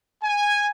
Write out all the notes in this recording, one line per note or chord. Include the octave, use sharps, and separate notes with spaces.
G#5